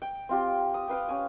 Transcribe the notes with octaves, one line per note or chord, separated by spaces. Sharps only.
G5
C4 F4 G4
D#6
G4 B4 F5 G5
C#4 G#5